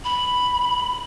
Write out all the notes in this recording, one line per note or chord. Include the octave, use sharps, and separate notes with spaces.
B5